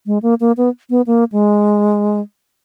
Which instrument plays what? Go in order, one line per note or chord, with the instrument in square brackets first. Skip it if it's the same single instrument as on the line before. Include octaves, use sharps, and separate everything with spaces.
[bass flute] G#3
A#3
A#3
B3
B3
A#3
G#3